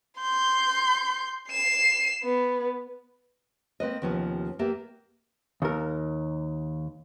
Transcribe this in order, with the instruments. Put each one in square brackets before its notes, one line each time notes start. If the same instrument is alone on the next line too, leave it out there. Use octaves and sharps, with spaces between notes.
[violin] C6 G6
C7 E7
B3
[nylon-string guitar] A#3 C4 B4 D#5
D#2 C3 F3 B3 C#4
A#3 B3 G4 E5
[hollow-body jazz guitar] D#2 A#4